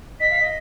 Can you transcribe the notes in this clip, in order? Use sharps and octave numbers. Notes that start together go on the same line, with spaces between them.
D#5 B6
F5
D#5